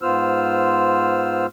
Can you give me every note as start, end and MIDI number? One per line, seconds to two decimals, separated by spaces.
0.02 1.46 44
0.02 1.46 59
0.02 1.46 65
0.02 1.46 72
0.02 1.46 88
0.02 1.46 89